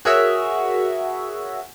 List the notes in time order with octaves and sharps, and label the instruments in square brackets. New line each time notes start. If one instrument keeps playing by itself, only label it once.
[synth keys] F#4 G#4 A#4 C#5 E5